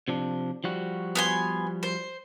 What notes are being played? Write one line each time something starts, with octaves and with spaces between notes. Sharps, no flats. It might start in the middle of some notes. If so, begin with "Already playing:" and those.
C3 F3 D4
F3 G3 F#4
B3 G#5 C6
C5